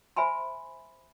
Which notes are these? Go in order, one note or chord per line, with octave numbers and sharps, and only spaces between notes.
C5 E5 G#5 B5 C6